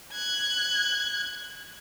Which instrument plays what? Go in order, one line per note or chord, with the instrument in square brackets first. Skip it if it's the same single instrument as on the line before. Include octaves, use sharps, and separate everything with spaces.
[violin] F#6 G#6